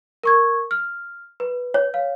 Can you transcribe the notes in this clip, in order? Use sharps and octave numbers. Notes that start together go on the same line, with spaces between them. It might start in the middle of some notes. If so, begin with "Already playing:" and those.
A#4 C#6 G#6
F6
B4
C#5
F5